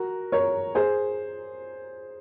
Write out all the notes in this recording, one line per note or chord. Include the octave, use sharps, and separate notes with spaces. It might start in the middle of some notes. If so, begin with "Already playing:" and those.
Already playing: F#4 A#4
A#4 C#5
G#4 C5